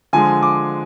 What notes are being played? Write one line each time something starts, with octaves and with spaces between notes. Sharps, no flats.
D3 F3 G#3 G#5
D6